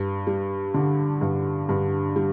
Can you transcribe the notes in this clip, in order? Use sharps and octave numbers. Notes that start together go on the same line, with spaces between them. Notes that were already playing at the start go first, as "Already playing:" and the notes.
Already playing: G2
G3
D3
G2
G2
G3